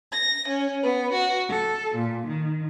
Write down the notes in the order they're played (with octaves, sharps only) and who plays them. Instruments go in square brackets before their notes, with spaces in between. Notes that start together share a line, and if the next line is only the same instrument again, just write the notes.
[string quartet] A#6
C#4
B3
F#4
A4
A#2
D#3